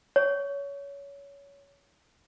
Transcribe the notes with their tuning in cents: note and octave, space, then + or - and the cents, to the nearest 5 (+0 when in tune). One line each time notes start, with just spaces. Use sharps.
C#5 +20